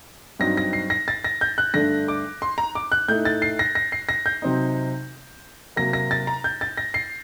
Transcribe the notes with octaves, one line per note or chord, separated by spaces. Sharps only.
G2 F#3 C4 D#4 A#6
A#6
C7
A#6
A6
A#6
G6
F#6
G2 D3 A3 D4 A#6
D6
C6
A#5
D6
F#6
A2 A3 D#4 G6
A6
C7
A#6
A#6
C7
A#6
G6
C3 F#3 C4 D#4
C3 F#3 A#3 A#6
A#6
A6
A#5
G6
A6
A#6
C7